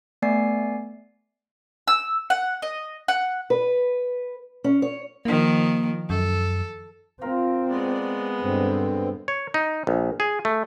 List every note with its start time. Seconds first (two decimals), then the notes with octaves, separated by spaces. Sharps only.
0.22 A3 B3 D5 G#5 C7
1.88 E6
2.30 F#5
2.62 D#5
3.08 F#5
3.50 B4
4.64 C#4
4.82 C#5
5.25 D#3 F3 A#3
6.10 F#2 A4
7.21 C4 F4 A#4
7.69 G#3 B3 D5
8.41 G2 B2 D3 C4
9.28 C#5
9.54 D#4
9.87 A#1
10.20 G#4
10.45 A3